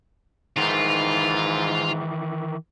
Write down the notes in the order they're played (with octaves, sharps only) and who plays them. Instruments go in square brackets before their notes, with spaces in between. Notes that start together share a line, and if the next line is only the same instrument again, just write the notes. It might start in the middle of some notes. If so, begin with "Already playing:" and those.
[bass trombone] G#2 [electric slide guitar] D#3 E3 [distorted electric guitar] F4